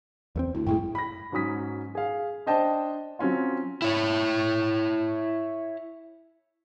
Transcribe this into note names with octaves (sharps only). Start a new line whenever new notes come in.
E2 A3 C4
D2 E4
F#2 A2 G#3 E4 G5
B5 A#6
G#2 F#3 C#4 D#6 B6
G#4 F5
D4 C5 D#5 G5 A5
F#3 C4 C#4 F4
E4 C#5